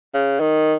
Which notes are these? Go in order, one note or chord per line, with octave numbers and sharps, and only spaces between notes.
C#3
D#3